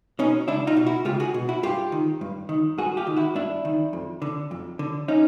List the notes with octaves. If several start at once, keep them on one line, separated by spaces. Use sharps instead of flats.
B2 C#4 D#4
C#2 D4 E4
D#4 F4
B2
E4 F#4
C#2 F4 G4
F#4 G#4
B2
E4 F#4
G2 F4 G4
D#3
G2
D#3
G2 F#4 G#4
F4 G4
D#3
E4 F#4
G2 D4 E4
D#3
F2
D3
F2
D3
C#4 D#4